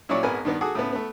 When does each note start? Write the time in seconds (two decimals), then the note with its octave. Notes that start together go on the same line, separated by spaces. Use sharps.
0.09 A#2 F#3 C#4 E4 C#5 D5
0.23 G#1 B3 A#4 B4 G#5
0.45 G2 D#3 B3 D4
0.61 F#4 G#4 A4 D6 D#6
0.75 A2 C#3 B3
0.92 A3 B3